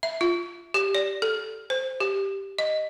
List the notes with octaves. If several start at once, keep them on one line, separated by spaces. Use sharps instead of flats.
E5
F4
G4
D5
A4
C5
G4
D#5